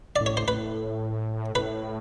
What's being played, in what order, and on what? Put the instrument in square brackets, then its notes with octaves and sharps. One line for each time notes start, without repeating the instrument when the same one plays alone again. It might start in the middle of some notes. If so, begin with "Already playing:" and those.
[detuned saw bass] A2 [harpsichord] D5
[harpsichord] C#5
C5
[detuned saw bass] A2 [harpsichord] B4
[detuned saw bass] A2 [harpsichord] B4